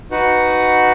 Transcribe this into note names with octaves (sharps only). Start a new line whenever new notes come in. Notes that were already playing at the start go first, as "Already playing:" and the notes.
D#4 F#4 B4 F#5